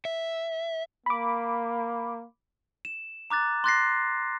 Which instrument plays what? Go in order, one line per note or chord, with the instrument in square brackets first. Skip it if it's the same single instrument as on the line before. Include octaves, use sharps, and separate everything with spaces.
[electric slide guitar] E5
[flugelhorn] A#3 [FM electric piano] B5 D6
[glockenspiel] E7
A#5 D6 F#6 A6
C6 D6 F#6 A6 A#6 C7